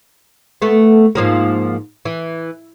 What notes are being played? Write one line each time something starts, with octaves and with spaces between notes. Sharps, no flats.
A3 B3
G#2 F3 A#3
E3